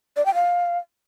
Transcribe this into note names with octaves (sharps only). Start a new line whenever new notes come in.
D5
G5
F5